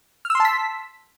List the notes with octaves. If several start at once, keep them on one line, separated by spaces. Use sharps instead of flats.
A5 C6 E6 F6 B6